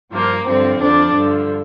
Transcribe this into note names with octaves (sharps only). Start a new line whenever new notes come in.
G2 F3 A#3
G2 D3 F3 C4
F2 F3 D4
G2 D3 F3